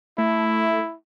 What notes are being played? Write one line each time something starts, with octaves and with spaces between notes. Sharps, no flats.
A3 E4